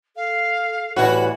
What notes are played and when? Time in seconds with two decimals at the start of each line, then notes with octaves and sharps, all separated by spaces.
0.16 A4 F5
0.96 A2 E3 G3 F#4 F#5